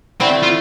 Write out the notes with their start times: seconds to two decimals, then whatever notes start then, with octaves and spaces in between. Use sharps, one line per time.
0.20 D3 A3 C4 E4
0.42 F4